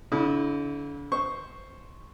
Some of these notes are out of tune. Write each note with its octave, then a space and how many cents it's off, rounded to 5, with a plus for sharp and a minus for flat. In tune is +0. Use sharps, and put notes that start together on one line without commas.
D3 -40 E4 -25
C5 +0 C#6 +0